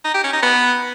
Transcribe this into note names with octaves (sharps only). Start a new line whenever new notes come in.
D#4
G4
C#4
D#4
B3